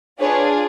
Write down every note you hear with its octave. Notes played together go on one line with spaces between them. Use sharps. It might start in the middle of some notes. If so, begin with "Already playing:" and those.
D4 F4 G#4 B4 C#5